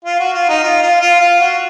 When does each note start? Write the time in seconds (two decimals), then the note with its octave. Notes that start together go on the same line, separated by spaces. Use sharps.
0.05 F4
0.20 F#4
0.33 F4
0.49 D#4
0.63 F4
0.82 F4
1.01 F4
1.21 F4
1.40 F#4